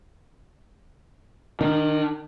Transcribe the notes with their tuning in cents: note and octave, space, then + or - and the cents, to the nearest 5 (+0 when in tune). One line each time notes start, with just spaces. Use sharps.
D#3 -15 D4 +20